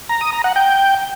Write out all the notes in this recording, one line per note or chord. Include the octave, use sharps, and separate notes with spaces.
A#5
D#6
A#5
F#5
G5